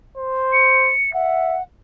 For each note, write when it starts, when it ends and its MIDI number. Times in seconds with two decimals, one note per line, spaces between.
0.17 0.93 72
0.52 1.13 97
1.13 1.57 76
1.13 1.63 78